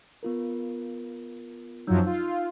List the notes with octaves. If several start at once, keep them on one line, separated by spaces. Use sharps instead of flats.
B3 F4 A#4
F#2 F3 F#3 D#4 E6 G6
F4